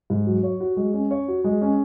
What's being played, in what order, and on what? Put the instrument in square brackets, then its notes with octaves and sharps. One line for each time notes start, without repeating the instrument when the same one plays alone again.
[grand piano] G#2
F#3
C#5
F#4
G#3
C#4
C#5
F#4
G#3
C#4